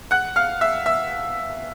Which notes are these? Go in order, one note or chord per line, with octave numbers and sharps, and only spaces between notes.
F#5 F#6
F5 F6
E5 E6
E5 E6